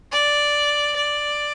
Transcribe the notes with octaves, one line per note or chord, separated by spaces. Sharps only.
D5
D5